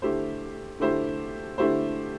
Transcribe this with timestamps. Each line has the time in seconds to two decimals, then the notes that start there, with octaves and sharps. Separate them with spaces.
0.02 D3 A3 E4 G4 C5
0.80 D3 A3 E4 G4 C5
1.58 D3 A3 E4 G4 C5